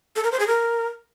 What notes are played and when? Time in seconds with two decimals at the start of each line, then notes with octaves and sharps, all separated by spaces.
0.16 A4
0.24 A#4
0.32 C5
0.40 G#4
0.47 A#4